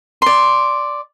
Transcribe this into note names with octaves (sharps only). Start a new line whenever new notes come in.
D5 C6